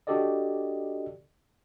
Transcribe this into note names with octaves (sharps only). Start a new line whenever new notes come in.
D4 F#4 G4 A4 D5 D#5